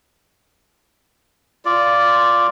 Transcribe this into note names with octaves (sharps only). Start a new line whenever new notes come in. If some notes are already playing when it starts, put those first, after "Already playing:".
F4 D5